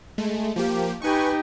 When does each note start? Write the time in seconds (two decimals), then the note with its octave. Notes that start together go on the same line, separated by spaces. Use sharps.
0.18 G#3 A3
0.56 F3 A#3 G4
1.02 D#4 G4 B4 G#5 C#6